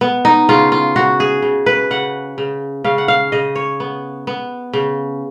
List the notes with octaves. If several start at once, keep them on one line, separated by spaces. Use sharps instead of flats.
B3
D#4
C#3 F4
F4
C#3 F#4
G#4
C#3
B4
C#3 F#5
C#3
C#3 F5
F#5
F5
C#3 D#5
C#5
B3
B3
C#3